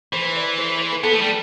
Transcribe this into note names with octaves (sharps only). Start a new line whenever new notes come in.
E3 C5
D5
C5
C5
C5
B4
B3 A4
A3
G3